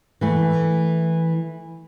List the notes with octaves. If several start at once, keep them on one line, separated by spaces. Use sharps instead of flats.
E3 A3